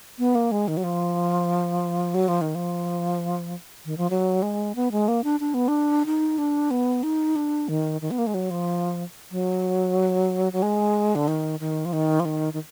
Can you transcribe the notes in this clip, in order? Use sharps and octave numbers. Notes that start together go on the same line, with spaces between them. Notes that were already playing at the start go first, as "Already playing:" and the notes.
B3
A#3
G#3
D#3
F#3
F3
F#3
F3
D#3
F3
D#3
F3
F#3
G#3
B3
G#3
A#3
D4
D4
B3
D4
D#4
D4
B3
D#4
D4
D#3
D#3
B3
A#3
G#3
F#3
F3
F#3
F#3
G#3
D3
D#3
D#3
F3
D#3
F3
D#3
D#3